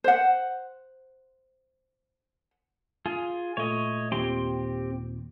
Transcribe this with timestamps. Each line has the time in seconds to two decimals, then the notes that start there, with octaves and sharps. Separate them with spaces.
0.04 C5 F#5
3.06 F4 G#4
3.57 A#2 A3 C#5 D#5
4.12 D#2 A#2 C4 G4 C6